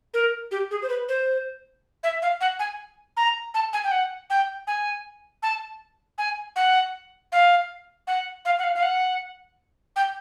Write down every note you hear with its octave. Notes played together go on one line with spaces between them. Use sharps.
A#4
G4
G#4
C5
B4
C5
E5
F5
F#5
G#5
A#5
A5
G#5
G5
F#5
G5
G#5
A5
G#5
F#5
F5
F#5
F5
F#5
F5
F5
F#5
G5